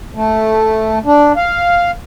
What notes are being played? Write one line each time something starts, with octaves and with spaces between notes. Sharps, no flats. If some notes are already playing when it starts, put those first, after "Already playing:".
A3
D4
F5